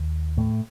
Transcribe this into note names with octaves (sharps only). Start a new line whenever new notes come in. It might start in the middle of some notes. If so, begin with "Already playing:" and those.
Already playing: D#2
A2 A3